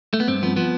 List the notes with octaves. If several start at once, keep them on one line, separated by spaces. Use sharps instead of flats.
A3
B3
G2 C4
F3 B3
F3 B3